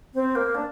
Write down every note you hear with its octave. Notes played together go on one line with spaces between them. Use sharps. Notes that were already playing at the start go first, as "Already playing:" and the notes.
C4
A#3
D4